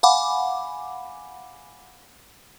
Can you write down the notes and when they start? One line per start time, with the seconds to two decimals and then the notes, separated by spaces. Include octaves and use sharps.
0.03 F5 F#5 G#5 B5 D6